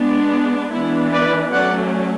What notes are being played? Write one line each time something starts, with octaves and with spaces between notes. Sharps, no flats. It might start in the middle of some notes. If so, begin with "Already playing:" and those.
Already playing: G#3 B3 D4
E3 G#3 B3 D4 E4
B4 D5
F#3 A3 C#4 D5 F#5